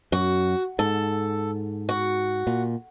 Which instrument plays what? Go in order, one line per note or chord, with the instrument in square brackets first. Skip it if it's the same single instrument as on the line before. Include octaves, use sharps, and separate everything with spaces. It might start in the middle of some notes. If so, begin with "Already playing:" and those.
[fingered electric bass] F#2 [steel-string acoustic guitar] F#4
[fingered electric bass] G#2 [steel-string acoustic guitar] A4
[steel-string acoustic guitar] F#4
[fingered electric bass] A#2